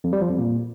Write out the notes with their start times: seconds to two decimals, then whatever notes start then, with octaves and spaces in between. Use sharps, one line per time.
0.04 F2
0.13 G3
0.21 F3
0.30 F2
0.38 A#2